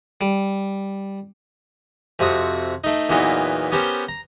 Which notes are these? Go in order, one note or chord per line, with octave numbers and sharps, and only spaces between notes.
G3
F2 C3 F#4 D#6
A3 D#4
E2 A#2 E3 F#3 B3 D#4
B3 C#4 G4 A#4 C5
A#5